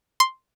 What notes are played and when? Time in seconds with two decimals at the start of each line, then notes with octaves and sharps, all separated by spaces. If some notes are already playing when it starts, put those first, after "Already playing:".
0.20 C6